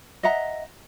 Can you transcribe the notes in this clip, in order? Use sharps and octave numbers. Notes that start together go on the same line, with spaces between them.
D#5 E5 F#5 A#5